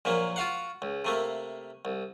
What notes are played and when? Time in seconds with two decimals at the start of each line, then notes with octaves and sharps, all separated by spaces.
0.05 A#1 A#2 F#3 A#3
0.36 F4 F#4 F5 F#5
0.82 C#2
1.05 C3 A3 A#3
1.85 C2